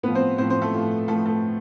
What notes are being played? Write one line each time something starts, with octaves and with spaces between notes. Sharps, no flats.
A2 F3 B3 B4
C4 C5
A2 F3 C4 C5
C4 C5
A3 A4
A2 F3
A2 F3 A3 A4
A3 A4